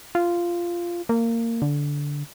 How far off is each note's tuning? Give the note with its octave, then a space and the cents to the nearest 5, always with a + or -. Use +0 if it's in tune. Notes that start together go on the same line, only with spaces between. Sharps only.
F4 -10
A#3 -20
D3 -15